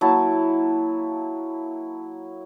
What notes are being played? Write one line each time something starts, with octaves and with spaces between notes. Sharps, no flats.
F#3 A#3 E4 A5